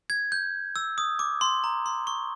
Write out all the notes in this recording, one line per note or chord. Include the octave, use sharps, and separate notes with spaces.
G#6
G6
E6
D#6
D6
C6
A#5
C6
C#6